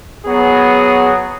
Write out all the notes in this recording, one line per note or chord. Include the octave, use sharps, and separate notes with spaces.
F#3 B3 G#4